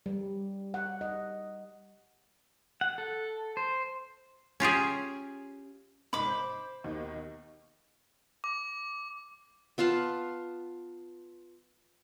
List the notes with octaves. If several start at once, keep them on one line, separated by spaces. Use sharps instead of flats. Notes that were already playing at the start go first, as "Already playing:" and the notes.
G3
F#5
D#5
F#5
A4
C5
C#4 F4 G4 G#4
C2 G#2 B5 D6
C5 G6
D#2 B2 D#3
D6
B3 F4 F5 A5